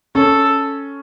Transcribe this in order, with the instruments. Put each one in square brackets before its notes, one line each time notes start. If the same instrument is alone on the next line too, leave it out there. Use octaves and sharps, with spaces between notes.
[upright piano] C#4 [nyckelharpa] A4